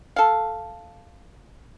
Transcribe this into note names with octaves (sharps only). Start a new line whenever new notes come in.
A4 F5